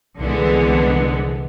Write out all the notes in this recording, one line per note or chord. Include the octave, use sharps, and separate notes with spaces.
C2 D3 E3 G#3 B3